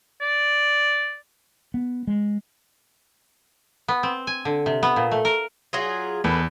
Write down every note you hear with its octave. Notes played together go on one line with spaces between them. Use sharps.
D5
B3
G#3
B3
C4
G#5
D3
C3
B3
A#2
A3
A#4
F#3 F4 G#4
E2 D#3 A4 B4